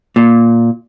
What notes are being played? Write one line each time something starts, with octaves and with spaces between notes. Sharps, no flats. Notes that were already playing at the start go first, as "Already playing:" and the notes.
A#2